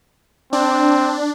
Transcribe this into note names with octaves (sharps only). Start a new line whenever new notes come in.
C4 D4